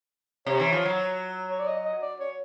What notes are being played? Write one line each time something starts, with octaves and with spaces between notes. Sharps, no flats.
C3 C#5
E3
F3
F#3
C#5
D5
D#5
D#5
D5
C#5